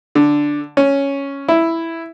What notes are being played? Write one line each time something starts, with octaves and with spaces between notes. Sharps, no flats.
D3
C#4
E4